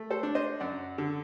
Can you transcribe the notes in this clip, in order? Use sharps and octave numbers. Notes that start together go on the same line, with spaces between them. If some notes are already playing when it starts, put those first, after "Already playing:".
Already playing: A3
A4 C5
D4
C5 D#5
F#2 D5 F#5
D3